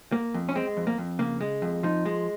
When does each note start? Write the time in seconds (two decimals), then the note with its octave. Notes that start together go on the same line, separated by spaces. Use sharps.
0.12 A#3
0.34 F2
0.49 C#4
0.55 G#3 C4
0.77 F2
0.87 A#3
0.98 F2
1.19 C#3 A#3
1.41 G#3
1.62 F2
1.83 F3 D#4
2.05 G#3